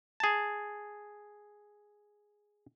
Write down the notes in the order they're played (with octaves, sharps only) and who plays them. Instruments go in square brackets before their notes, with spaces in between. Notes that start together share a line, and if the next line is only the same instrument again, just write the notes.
[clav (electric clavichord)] G#4 A5